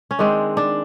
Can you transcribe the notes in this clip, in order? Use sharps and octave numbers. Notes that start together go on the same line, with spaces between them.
C#4
D#3 G#3 C4 D4
D4